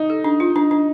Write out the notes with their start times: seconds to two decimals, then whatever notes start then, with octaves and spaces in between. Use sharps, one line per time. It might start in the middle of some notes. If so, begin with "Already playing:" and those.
Already playing: D#4
0.10 A4
0.24 D4
0.40 F4
0.56 D4
0.71 D4